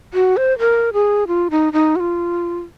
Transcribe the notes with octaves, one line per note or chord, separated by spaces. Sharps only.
F#4
C5
A#4
G#4
F4
D#4
D#4
F#4
F4